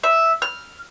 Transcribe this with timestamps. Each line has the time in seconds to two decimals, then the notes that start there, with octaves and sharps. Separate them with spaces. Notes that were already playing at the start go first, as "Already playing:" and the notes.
0.03 E5
0.42 F6